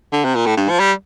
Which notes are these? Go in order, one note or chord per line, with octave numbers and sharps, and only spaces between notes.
D3
C3
A#2
A2
G2
F3
G3